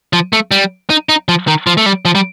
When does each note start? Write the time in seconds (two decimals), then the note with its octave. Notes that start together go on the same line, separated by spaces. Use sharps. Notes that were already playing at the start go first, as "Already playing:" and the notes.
0.13 F3
0.33 A3
0.51 G3
0.90 D#4
1.09 D#4
1.29 F3
1.48 D#3
1.67 F3
1.77 A3
1.86 G3
2.05 F3
2.15 G3